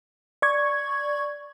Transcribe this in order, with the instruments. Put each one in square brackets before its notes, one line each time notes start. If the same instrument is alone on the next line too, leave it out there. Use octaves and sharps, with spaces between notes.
[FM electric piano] D5 C#6 G#6